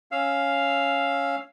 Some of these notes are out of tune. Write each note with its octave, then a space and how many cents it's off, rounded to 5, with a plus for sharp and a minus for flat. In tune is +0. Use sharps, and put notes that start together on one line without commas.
C#4 +0 F5 +0 E6 +0